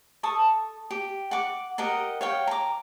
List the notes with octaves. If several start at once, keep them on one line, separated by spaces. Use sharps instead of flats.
A4 A5 C#6 D#6
G4
F#5 D6
G4 A#4 D#5 F#5
C#5 F5 G5
A#5 D6